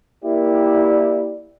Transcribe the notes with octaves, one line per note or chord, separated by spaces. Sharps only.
A#3 E4 G4 D5